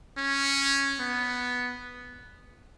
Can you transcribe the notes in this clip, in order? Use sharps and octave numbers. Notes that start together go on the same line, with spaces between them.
C#4
B3